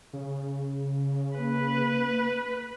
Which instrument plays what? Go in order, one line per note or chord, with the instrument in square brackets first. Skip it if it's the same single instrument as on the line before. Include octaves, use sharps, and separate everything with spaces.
[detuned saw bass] C#3
[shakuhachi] A#3 [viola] B4